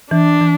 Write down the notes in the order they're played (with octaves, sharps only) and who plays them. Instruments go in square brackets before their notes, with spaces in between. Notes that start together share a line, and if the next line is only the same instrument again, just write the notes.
[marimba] E3 [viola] D4
[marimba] E3